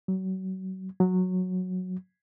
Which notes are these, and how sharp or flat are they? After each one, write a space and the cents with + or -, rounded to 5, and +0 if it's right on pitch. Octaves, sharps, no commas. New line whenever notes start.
F#3 +30
F#3 -10